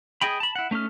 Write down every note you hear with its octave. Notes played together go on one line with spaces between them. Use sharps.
G#4 D#5 G5 B5
A5 B5
E4 F#5
A3 C#4 D#4 A4 F6